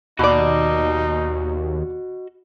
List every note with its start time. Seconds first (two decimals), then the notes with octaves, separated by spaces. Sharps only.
0.19 D#2 B2 D#4 F#4 D5 D#5